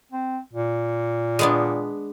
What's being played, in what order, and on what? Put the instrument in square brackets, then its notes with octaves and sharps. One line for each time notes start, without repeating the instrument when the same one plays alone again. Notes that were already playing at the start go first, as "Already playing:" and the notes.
[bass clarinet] C4
A#2
[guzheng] G#3 B3 D4